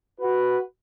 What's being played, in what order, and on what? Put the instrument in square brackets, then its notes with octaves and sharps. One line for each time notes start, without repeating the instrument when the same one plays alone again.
[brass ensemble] F#4 B4